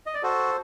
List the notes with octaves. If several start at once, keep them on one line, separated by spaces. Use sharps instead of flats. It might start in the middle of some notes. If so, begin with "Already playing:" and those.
D#5
D5
F#4 A4 C5